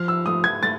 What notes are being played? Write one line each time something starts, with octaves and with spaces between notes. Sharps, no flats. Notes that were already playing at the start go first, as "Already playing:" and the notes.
Already playing: F3 F6
E6
A3 D#6
G#6
A3 A6